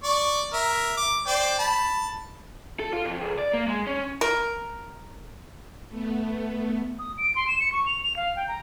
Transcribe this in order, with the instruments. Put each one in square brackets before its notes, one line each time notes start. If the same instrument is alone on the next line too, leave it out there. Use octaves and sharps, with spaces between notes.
[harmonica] D5 C#6
A#4 E5
D6
C5 D5 G5
A5 B5
[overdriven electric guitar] A4
F4
F2
C#2
D5
A#3
G#3
C#4
[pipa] A#4
[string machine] A3 B3
[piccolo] D#6
D7
C6
E7
C#7
C#6
F7
F7
F5
G5
A#5